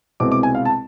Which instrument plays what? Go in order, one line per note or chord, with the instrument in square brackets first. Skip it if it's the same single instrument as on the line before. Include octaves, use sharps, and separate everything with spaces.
[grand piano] C2 B2 G#3 C4 E4 D6
D6
G#5
F5
A5